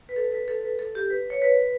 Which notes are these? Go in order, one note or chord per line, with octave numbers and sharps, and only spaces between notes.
B4
A4
B4
A4
B4
A4
G4
B4
C#5
B4